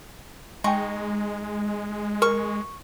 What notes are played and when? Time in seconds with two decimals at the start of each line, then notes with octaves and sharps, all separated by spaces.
0.64 G#3 D#4 G5 G#5 C6 C#6
2.22 A#4 C#6